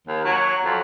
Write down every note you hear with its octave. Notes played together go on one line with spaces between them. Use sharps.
D#2
F#3
F2